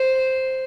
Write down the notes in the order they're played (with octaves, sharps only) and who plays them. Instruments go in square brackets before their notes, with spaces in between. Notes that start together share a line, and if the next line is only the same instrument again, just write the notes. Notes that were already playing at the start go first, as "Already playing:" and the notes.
Already playing: [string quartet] C5